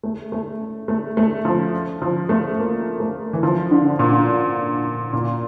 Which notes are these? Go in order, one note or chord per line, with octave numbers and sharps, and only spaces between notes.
A3
A3
A3
A3
F3
F3
A3
A#3
A3
E3
F3
D3
A#2
A#2